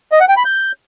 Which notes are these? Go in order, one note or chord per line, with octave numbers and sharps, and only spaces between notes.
D#5
F#5
G5
B5
G6